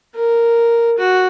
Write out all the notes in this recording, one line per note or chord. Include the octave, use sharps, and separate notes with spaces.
A#4
F#4